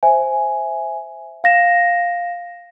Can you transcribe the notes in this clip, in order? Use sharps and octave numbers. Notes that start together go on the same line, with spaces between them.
C5 E5 G#5
F5 A#6 E7